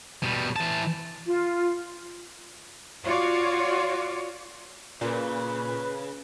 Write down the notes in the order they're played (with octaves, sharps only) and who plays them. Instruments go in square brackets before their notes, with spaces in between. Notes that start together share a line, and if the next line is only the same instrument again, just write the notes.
[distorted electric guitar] B2 G3
E3 A5
[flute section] F4
[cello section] F4 F#4 C#5 D5
[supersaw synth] A#2 [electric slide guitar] C#3 [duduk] B4